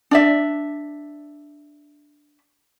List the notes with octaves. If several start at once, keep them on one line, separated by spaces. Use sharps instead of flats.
D4 D5 E5